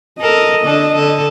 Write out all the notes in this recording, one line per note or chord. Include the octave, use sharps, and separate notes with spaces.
A4 A#4 D#5
D3 D4 A4
D3 A4